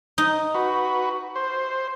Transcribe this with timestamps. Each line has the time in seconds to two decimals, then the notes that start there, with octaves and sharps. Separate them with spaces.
0.18 D#4
0.55 F#4 B4
1.35 C5